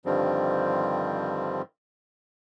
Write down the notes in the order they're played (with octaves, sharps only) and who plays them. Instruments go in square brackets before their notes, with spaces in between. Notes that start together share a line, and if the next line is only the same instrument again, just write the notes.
[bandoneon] G2 D3 D#3 F3 G3 C4